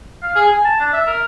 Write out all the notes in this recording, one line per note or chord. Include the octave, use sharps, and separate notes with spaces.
F5
G#4
G#5
A5
D4
E5
A#4